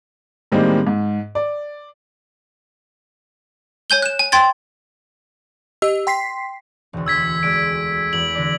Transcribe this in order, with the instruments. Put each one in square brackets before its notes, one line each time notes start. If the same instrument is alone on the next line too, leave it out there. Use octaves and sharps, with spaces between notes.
[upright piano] A2 D#3 G3 G#3 A#3 C4
G#2
D5
[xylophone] C#5 G#5 G6 G7
F#6 E7
G#5
G5 C6 G#6 A6
[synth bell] G4 D#5 E6
G5 C6 B6 C7
[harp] E1 D2
[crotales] E6 G#6 B6
[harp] D3 G#3 D4 [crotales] D7
[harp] E2 [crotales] F#7
[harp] D3 A#4 D5